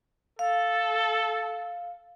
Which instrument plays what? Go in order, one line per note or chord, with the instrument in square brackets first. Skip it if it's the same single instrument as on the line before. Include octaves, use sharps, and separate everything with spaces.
[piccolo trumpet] A4 [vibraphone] F5